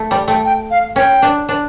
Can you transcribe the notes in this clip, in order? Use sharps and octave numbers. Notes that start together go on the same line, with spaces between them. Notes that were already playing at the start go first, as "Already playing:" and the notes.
Already playing: A3
G3 G5
A3 G5
G5
F5
C#4 G5
D4
D4